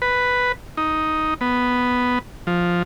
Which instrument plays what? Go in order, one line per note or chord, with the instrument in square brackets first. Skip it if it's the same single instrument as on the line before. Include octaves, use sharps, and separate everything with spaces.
[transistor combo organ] B4
D#4
B3
F3